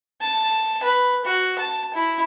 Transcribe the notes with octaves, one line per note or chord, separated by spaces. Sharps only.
A5
B4
F#4
A5
E4